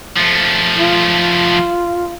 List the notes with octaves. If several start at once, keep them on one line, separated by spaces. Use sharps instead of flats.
F3 A3
F4